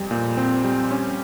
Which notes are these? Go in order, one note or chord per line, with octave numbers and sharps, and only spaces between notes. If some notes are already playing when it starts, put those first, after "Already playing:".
Already playing: F2 G3
A#2
C4
G3
C#4